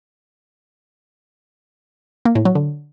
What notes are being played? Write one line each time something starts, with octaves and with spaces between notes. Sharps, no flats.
A#3
A2
F#3
D3